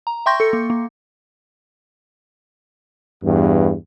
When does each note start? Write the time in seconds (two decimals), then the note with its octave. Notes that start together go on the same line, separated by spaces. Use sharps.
0.07 A#5
0.26 E5 G5 C6 C#6 G6 A#6
0.40 A4 C#7
0.53 A#3
0.70 A#3
3.24 E2 G2